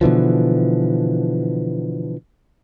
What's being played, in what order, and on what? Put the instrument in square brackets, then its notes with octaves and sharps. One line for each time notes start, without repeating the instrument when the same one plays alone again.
[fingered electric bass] B2 D3 E3 F3